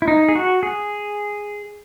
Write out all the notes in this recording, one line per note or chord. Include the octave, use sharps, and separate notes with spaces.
E4
D#4
G#4
F#4
G#4